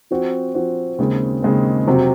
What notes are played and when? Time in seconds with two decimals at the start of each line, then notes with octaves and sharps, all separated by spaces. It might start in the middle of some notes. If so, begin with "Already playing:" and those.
0.11 F3 C4 F#4
0.55 F3 C4 F#4
0.98 D#2 C#3 G#3 C4
1.42 D#2 C#3 G#3 C4
1.87 F2 C3 F#3 C4